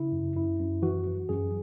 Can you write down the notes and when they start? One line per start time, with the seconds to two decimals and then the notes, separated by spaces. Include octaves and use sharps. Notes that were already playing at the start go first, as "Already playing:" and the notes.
Already playing: C#3 E4
0.12 F#2
0.36 F#2 E4
0.59 F#2
0.82 E3 F#4
1.07 E3
1.29 F#2 G#4